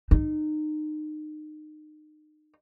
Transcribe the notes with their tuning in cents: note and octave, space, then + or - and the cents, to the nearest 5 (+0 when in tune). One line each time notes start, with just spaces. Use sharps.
D#4 -30